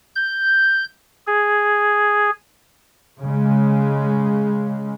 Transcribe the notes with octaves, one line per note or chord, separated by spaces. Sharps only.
G6
G#4
C#3 G#3